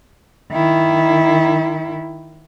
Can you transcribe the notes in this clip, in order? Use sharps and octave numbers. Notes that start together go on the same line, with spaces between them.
D#3 E4